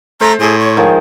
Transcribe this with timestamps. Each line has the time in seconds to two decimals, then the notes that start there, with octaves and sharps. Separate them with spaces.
0.21 A3 C5 A#5
0.40 A2 G#4
0.59 C#5
0.77 D#3 F3 G#3